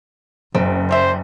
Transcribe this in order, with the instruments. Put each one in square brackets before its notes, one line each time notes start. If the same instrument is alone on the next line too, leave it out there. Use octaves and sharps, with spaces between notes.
[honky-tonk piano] F#1 [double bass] F#2 [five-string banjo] C4
[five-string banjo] G3 E5 [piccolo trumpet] C5